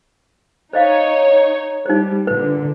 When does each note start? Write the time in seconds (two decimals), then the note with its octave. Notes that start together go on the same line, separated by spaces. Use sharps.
0.73 D#4 C5 C#5 D#5 F5
1.86 G3 D#4 C5
2.27 A#2 D3 B4